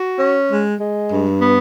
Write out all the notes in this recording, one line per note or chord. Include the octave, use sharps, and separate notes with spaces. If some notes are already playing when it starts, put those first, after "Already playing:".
Already playing: F#4
C#4
G#3
G#3
G2
B3